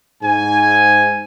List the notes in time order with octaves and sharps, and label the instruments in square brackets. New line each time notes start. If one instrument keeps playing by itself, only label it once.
[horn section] G#2 G#5